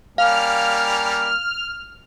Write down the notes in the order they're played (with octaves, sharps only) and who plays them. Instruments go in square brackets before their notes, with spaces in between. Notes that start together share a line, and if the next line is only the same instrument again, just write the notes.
[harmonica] G3 A#3 C#4 [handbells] F5 [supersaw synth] F6